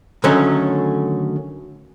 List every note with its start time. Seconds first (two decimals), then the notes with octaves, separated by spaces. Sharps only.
0.24 D3 D#3 F#3 A3 C#4